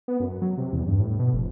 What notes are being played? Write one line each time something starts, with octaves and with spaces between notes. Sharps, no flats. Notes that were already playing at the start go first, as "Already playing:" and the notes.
B3
F#2
F#3
C3
E2
G2
A2
B2
F1